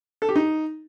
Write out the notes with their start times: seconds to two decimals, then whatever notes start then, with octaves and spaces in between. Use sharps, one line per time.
0.22 A4
0.29 G4
0.36 D#4